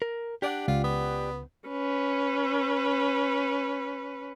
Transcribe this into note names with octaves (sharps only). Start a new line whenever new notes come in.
A#4
D4 G4 D5 F#5
C#2 F4
B3
C#4 B4